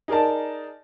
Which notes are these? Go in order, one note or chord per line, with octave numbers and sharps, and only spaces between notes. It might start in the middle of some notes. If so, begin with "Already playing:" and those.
D#4 G#4 A#4 D5 A5